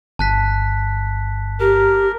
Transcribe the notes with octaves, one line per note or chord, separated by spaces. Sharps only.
G1 A5 F#6 B6
G4 A#4